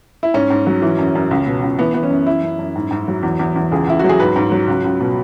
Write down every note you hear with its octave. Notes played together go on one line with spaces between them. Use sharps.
E4
G#2 C#4
G#2
F#3
E3
F#2
F#2
C#2
B2
C#2
E3 B3
E3 B3
C#4
F#2
E3 E4
F#2
F#2
G#2
G#2
F#3
E2
E2
E2
C#2 G#4
C#2 E4
F#3 F#4
G#4
G#2 B4
G#2
F#3
C#2
C#2
B2